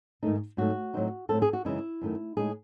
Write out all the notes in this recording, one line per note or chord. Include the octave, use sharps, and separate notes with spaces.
G#2 D#3 A3 D#4
G#2 F#3 A3 F#4
A2 F#3 C4 D#4
A2 F#3 A3 C4 A4
G#4
F#4
F#2 C#3 E3 G#3 D#4 E4
F#2 D#3 A3
A2 G#3 D#4 G#4